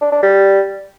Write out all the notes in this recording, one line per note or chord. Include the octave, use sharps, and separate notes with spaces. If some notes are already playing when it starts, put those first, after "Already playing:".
D4
D4
G3